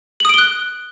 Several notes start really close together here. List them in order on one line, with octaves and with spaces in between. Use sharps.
F#7 D#6 D7 G7 F#6